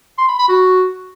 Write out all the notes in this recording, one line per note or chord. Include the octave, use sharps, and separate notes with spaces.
C6
B5
B5
F#4